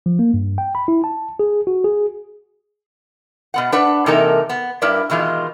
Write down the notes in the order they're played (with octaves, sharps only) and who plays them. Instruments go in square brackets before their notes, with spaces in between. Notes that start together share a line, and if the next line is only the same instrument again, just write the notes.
[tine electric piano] F3
A#3
G2
G5
B5
E4
A5
G#4
F#4
G#4
[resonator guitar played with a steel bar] B2 B3 F#5
D4 B4 F#5
C3 E3 A#3 D#4 A4 A#4
B3
G2 E4 A#4 B4 D5
B2 D#3 E3 G#3 F4